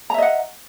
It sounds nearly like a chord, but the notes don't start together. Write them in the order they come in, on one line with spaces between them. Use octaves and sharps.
A#5 E5 D#5 F#5